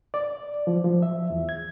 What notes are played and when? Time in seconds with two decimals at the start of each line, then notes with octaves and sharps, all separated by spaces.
0.14 D5
0.67 F3
0.84 F3
1.02 E5
1.30 E2
1.49 G#6